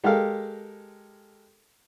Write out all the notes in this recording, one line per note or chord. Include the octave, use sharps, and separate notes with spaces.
G#3 G4 A4 A#4 F5